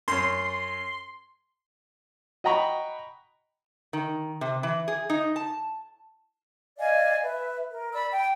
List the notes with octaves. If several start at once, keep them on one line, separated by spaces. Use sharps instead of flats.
F#2 C#4 C6
D#5 F#5 G5 A#5 B5 C#6
D#3
C3
E3
G#4
D#4
A5
D5 D#5 F5 G#5
B4 E5
A#4
D5 B5 E6
G5